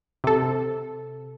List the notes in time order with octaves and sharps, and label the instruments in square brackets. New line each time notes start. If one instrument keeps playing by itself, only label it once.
[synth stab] C3 A4